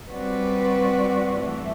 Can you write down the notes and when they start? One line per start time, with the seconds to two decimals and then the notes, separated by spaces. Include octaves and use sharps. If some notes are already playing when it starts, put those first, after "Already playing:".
0.11 G3 C4 F#4 B4 D5
1.38 G2 E3 A3